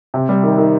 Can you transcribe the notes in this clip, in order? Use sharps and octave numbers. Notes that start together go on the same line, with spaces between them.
C3
G3
D#3
D#3